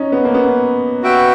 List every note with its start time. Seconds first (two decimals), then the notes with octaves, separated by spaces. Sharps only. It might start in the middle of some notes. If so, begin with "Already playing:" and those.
Already playing: C#4 D#4
0.12 B3
0.25 A#3
0.34 B3
1.03 F#4 B4 E5 G5